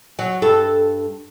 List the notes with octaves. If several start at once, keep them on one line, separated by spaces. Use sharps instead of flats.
F#3
G2 A4